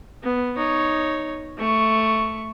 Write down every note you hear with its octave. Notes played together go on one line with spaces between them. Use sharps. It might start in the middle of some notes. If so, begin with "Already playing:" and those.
B3
D#4 C#5
A3 C#6